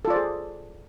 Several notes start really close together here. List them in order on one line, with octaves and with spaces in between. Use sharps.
A4 F4 D5 C5 G#4